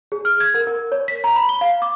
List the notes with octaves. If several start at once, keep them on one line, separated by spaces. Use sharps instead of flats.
G#4
F6
G#6
A#4
A#4
C#5
B6
A#5
B5
G7
F5
D6